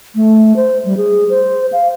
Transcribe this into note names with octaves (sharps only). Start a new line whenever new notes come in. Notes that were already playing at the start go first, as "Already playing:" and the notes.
A3
C5
G3
G#4
C5
F5